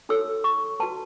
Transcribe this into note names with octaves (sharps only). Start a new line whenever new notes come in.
D#4 F#4 A4 C#5 E6
C#6
F#4 B4 A5